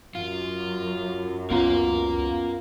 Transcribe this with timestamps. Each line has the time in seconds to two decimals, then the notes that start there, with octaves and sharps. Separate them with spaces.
0.15 F#2 F4
1.50 C#2 B3 C#4 F4 A#4 F5 A#5